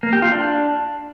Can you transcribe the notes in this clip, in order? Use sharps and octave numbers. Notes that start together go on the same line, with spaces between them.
A#3
G4
F4
D4